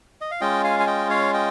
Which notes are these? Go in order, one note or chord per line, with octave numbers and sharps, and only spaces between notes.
D#5
F5
G#3 C#4 F4 D#5 G5
F5 G#5
G#5
D#5 G5
C#5 F5
D#5 G5